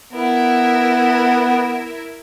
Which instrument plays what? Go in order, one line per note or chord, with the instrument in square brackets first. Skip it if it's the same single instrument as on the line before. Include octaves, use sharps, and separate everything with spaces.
[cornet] B3 [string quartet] E4 A#4